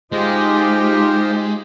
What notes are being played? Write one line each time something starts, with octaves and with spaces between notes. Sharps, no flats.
G#3 D#4 F4 G4 C5 D#5